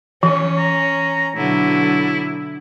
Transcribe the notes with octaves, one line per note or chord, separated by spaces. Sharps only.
E3 C#4
A#5
B2 D3 F#3 E4